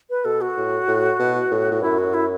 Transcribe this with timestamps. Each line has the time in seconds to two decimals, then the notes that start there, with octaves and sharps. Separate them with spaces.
0.10 B4
0.25 B2 A4
0.41 F#4
0.57 A2
0.88 A2
1.20 B2
1.51 A2
1.71 A2
1.82 F#2 E4
1.98 F#4
2.14 E4